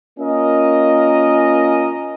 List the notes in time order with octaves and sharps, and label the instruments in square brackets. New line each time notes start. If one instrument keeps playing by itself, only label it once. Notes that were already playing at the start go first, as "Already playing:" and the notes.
[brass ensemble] A#3 C#4 F4 A#4 D#5